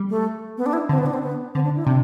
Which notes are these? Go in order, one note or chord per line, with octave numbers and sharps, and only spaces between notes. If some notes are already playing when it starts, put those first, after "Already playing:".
Already playing: G3
A3
B3
D4
E4
D3 C4
B3
D4
C4
B3
D3 C4
D4
E4
C3 D4